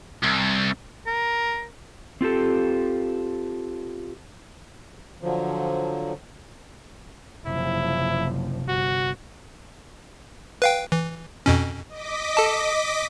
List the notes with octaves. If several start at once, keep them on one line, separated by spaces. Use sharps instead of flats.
C2
A#4
C4 F4 G4 A4
D3 F3 F#3
F#1 C3 F3 E4
G1 F#4
B4 F5 G5
E3
F2 B2 C#4
D#5 D6 B6
A4 A5